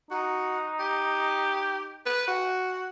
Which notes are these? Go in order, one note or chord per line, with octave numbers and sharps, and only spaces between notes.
D#4 F#4
G4
B4
F#4